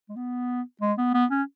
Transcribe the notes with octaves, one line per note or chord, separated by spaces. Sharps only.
G#3
B3
G#3
B3
B3
C#4